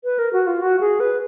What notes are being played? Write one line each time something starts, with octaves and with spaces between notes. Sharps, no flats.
B4
A#4
F#4
F4
F#4
G#4
B4